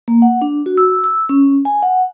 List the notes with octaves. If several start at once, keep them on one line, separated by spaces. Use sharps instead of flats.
A#3
F#5
D4
F#4
E6
E6
C#4
G#5
F#5